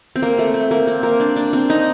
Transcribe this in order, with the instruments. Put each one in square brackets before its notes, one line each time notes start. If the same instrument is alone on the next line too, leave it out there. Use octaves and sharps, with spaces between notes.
[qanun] C4
A#3
A3
C4
A#3
C4
A#3
D4
D4
C4
D#4